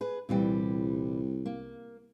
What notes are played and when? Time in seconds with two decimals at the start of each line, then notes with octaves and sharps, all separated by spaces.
0.01 G#4 B4
0.29 C2 A#2 E3 G3
1.46 A#3